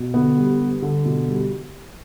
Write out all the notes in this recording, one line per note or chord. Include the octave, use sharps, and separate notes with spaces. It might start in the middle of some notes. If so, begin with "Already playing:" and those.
Already playing: B2
D3 B3
G3
G3
D3
B2
G3